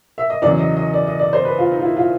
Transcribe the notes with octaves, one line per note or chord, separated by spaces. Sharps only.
E5
D#5
E2 C#3 F#3 D5
D#5
D#5
D5
D#5
D5
C5
B4
F4
D#4
F4
E4
F4